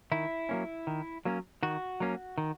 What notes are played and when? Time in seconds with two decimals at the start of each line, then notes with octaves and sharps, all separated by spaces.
0.12 D#3 E4
0.49 F#3 A#3 C#4
0.87 D#3
1.25 F#3 A#3 C#4
1.63 D#3 F#4
2.00 F#3 A#3 C#4
2.38 D#3